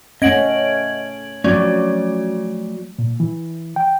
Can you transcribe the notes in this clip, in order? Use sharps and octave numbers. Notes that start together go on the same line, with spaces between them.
A3 C#4 D#5 F#5 G#6 D7 F#7
F3 F#3 A3 C#4 F#4 D5
A#2
E3
G5